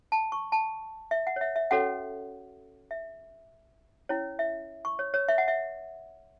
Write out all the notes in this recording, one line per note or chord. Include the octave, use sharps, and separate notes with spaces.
A5
C#6
A5
E5
F#5
C#5
E5
E5
C#4 F#4 A4 C#5 F#5
E5
C#4 E4 C#5
E5
C#6
C#5
C#5
E5
F#5
E5